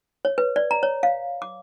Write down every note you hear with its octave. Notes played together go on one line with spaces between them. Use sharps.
C#5
B4
D5
A#5
C#5
F5
D6